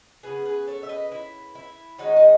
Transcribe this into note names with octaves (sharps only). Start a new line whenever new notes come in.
C#3 F#3 B3 G#4 B4
G#4 B4
A4 C#5
E5
B4 D#5
E4
E4
D#3 G#3 C#4 D#4 F#4
D#5